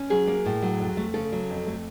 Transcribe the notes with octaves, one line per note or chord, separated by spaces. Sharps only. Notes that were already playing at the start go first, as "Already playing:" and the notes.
Already playing: C#4
F#3 G#4
A#3
A2
F#3
F2
A3
C#3 A4
F#3
F2
A3